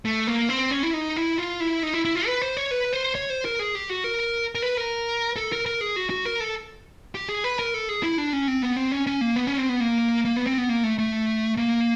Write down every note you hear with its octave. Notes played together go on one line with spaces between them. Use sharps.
A3
A#3
C4
C#4
E4
D#4
E4
F4
E4
D#4
E4
E4
F4
B4
C5
C#5
B4
C5
C#5
C5
A#4
G#4
G4
F#4
A#4
A#4
B4
A#4
A4
A#4
A#4
G#4
F#4
F#4
A#4
A4
G4
G#4
B4
A#4
A4
G#4
E4
D4
C#4
C4
B3
C4
C#4
C#4
A#3
B3
C#4
C4
B3
A#3
A#3
B3
C4
B3
A#3
A3
A3
A#3